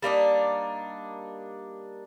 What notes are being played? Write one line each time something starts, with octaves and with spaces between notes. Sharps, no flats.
G3 A#3 D4 D#4